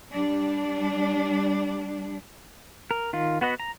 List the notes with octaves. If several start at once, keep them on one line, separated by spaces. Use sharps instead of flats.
G3 D4
A#4
D#3 F4
B3 F#4 B4 D#5
A#5